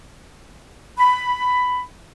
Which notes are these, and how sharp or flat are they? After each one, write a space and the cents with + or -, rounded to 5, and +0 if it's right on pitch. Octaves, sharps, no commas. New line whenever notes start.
B5 +10